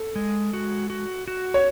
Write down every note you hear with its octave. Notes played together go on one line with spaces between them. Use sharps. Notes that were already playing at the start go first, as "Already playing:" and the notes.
Already playing: A4
G#3
F#4
F#4
F#4
C#5